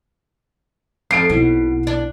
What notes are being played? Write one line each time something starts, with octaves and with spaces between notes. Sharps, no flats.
F2 C7 D7
B1 B2 E4
D4